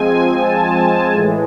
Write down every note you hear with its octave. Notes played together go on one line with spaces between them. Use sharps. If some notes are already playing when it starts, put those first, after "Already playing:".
Already playing: F3 G#3 C4 G#5
A5
A2 E3 G#3